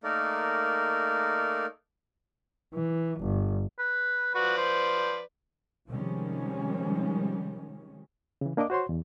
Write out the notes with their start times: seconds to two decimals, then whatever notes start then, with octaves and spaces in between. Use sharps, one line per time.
0.04 A3 A#3 D#4 A#4 D5
2.74 E3
3.20 G1
3.79 B4
4.35 F3 F#4 B4 D5
4.58 C5
5.89 C3 D#3 F3 G3 G#3 C#4
8.41 C#3 E3
8.57 A#3 D4 A#4 D#5 D6
8.70 F#4 C5 C#5 C6
8.89 E2